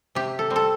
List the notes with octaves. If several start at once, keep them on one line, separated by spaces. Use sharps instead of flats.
C3 G4
A4
G3 C4
A4